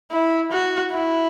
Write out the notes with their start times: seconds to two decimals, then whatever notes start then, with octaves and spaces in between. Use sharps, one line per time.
0.11 E4
0.51 F#4
0.92 E4